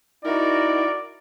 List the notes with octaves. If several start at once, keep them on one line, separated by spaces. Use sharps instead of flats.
D#4 E4 F#4 A#4 D5